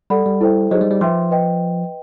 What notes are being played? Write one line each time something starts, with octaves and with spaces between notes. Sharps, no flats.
G3 A4 D5 F#5 B5
G3
E4 A4 C5 E5 G5
F#3 D#4 G#4 C5 D#5
G3
G3
F3 B4 E5 G5 C6
B4 D#5 G5